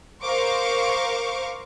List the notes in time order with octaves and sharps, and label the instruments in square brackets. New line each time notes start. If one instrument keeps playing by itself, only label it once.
[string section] A#4 C5 F5 C#6 D6